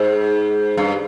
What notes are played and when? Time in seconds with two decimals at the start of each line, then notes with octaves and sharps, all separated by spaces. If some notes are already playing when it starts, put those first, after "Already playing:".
Already playing: G#2
0.77 G2